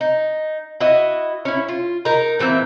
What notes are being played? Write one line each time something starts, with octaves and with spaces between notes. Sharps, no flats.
D#4
E4 F#4 D#5
C#4 E4
F4
D#4 A#4
A#2 E3 C4 E5